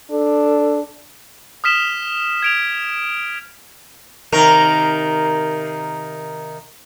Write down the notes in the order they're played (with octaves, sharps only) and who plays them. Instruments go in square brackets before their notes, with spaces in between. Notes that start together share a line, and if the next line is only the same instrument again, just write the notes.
[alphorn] D4 [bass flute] A4
[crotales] D#6 F6 B6 E7 G7
G#6 D7 F7
[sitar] C3 D#3 A#4